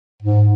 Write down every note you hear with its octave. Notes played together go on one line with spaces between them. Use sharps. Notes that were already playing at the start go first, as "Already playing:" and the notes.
G#2